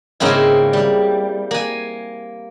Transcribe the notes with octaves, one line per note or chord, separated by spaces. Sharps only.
G#2 C#3 A#3 C4 E4
G3
A#3 G#5